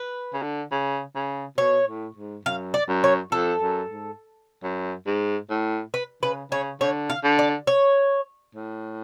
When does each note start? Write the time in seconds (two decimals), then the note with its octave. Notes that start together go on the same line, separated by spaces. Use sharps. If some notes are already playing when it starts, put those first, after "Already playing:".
Already playing: B4
0.34 C#3
0.42 D3
0.72 C#3
1.15 C#3
1.58 B2 C#5
1.87 A2
2.16 G#2
2.45 F#2 F5
2.74 D5
2.89 F#2
3.04 C#5
3.32 F2 A4
3.62 F#2
3.90 G#2
4.63 F#2
5.07 G#2
5.50 A2
5.94 B4
6.23 C#3 B4
6.51 C#3 C#5
6.81 D3 C#5
7.10 F5
7.24 D3
7.39 D5
7.67 C#5
8.55 A2